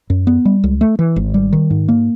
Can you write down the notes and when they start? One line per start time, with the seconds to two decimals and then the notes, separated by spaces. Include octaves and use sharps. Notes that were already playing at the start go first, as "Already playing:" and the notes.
0.10 F#2
0.27 B3
0.45 G3
0.64 C#2
0.81 A3
0.99 E3
1.16 G#1
1.34 G3
1.53 D#3
1.70 G#2
1.88 A#3